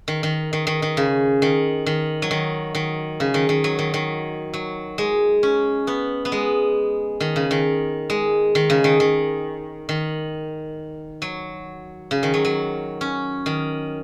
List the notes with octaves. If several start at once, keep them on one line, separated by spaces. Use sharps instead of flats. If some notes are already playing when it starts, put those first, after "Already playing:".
D#3
D#3
D#3
D#3
D#3
C#3
D#3
D#3
F#3
D#3
D#3
C#3
D#3
D#3
F#3
D#3
D#3
F#3
G#3
C#4
B3
B3
G#3
D#3
C#3
D#3
G#3
D#3
C#3
D#3
D#3
D#3
F#3
C#3
D#3
F#3
F#3
C#4
D#3